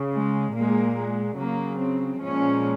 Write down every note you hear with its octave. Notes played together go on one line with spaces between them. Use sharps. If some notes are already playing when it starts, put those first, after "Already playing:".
Already playing: C#3
G#3
A#2 G#3 A#3
G#3
C#3 F#3 A#3
C4
A#2 F3 G#3 C#4